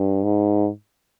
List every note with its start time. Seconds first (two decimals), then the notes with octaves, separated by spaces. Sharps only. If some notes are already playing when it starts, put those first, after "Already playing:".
Already playing: G2
0.23 G#2